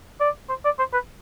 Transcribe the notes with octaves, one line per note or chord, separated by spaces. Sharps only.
D5
C5
D5
C5
B4